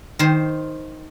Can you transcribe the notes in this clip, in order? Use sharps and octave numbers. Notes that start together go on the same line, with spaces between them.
D#3 C5